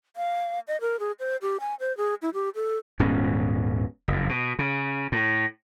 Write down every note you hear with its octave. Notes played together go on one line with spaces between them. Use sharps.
F5
D#5
A#4
G#4
C5
G4
G#5
C5
G#4
E4
G4
A4
D#1 G#2 B3 C#4
F#1 F2
B2
C#3
A2